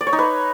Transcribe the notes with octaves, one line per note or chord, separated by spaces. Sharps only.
D5
C#5
D#4
B4